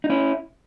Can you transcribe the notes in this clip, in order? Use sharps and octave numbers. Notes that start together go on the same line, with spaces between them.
D#4
C#4 E4